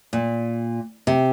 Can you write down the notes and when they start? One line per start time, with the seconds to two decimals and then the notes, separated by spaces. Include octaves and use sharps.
0.13 A#2
1.07 C3